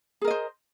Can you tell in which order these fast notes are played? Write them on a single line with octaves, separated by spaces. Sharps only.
G#4 A#4 D#5 C5